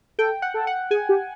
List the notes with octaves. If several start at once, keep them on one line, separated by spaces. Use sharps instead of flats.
A4 G5
F#5
A4
F#5
G#4 G#5
G4